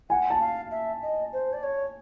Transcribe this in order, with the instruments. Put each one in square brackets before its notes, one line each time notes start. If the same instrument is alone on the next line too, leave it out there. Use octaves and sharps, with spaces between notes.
[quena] F#5 [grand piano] G#5
[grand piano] A5
[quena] F5
E5
D#5
C5
D5
C#5